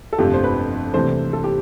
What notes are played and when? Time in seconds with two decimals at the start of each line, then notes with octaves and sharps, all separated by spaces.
0.13 A4
0.18 G1 F2 C3 F3 A3 G4
0.34 C5
0.44 B4
0.94 C2 C3 E3 A3 C5
1.33 A4
1.44 G4